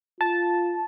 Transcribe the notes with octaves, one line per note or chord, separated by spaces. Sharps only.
F4 A5